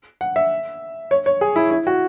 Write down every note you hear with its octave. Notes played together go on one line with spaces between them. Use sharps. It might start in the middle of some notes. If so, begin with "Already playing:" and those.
F#5
E5
C#5
C#5
G#4
E4
E4
F#4